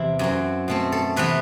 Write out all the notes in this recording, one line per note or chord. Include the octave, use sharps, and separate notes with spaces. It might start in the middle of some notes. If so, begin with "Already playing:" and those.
Already playing: E2 C3 E3 E4
F#2 F#3 C4
B2 A3 C4
A4
C3 E3 B3 B4